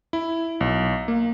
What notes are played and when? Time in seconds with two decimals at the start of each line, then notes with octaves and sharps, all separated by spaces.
0.13 E4
0.61 B1
1.08 A#3